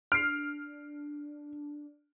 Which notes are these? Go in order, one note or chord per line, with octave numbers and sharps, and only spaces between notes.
D4 F6 C7 D7